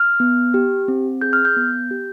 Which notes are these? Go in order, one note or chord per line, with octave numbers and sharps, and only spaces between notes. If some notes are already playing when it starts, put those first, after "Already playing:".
Already playing: F6
B3
G4
C4
G#4 G6
F6
G6
B3
G4